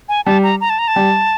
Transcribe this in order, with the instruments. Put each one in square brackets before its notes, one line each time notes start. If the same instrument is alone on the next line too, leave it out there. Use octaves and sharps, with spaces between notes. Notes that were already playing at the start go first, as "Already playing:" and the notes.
[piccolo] G#5
[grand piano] G3 [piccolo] A5
[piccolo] A#5
A#5
A5
A#5
A5
[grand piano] G3